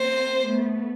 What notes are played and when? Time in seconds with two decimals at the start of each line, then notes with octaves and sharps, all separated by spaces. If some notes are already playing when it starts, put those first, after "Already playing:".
Already playing: A#3 C4 C5
0.48 A3 B3